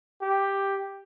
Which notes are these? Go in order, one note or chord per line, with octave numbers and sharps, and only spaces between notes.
G4